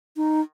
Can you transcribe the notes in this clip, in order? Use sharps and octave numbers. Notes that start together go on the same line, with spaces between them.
D#4